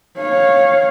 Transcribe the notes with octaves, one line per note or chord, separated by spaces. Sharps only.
C#5 F5